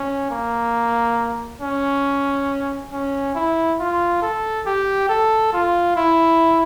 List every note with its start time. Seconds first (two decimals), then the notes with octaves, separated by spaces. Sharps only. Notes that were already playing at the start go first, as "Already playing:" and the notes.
Already playing: C#4
0.31 A#3
1.61 C#4
2.92 C#4
3.35 E4
3.79 F4
4.22 A4
4.66 G4
5.09 A4
5.53 F4
5.96 E4